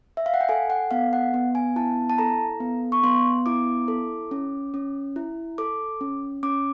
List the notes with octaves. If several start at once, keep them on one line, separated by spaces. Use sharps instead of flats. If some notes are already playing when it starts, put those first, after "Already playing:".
E5
F5
F#5
G5
A4 G#5
F#5
B3 F5
F#5
B3
G#5
E4 A5
A5
A4 A#5
B3
C#6
B3 C6
E4 D6
A4
C#4
C#4
E4
A4 D6
C#4
C#4 D6